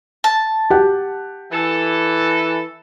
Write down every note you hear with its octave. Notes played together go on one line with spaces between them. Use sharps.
A5
G4 F#5
E3 A4